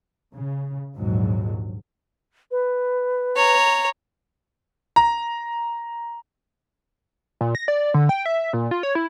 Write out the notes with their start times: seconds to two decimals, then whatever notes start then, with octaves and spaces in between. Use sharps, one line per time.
0.33 C#3
0.96 A#1 D#2 G#2 F#3
2.51 B4
3.36 C#5 A#5
4.96 A#5
7.41 A#2
7.55 A#6
7.68 D5
7.94 D3
8.09 G5
8.26 E5
8.53 A#2
8.71 F4
8.83 C#5
8.95 E4